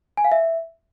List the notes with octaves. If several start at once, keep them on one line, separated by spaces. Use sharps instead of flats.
G#5
F5
E5